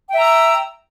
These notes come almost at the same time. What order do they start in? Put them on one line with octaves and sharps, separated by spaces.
G5 E5 A#5 E6